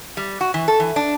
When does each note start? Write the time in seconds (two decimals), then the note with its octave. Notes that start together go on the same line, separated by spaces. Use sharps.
0.17 G3
0.41 F#4
0.54 E3
0.68 A4
0.80 E3
0.96 D4